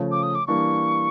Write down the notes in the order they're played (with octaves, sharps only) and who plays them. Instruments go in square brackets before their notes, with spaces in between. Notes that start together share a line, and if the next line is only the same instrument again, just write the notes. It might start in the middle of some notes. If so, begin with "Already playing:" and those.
Already playing: [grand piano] C#3 F3 A3
[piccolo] D6
D#6
D6
[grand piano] E3 G3 A#3 D4 [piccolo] C#6